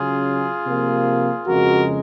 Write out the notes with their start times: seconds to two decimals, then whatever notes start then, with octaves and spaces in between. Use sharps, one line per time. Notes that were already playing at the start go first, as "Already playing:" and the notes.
Already playing: C#3 F#3 C#4 F4 G#4
0.65 C3 F3 A#3
1.46 F2 C#3 G#3 F#4 A#4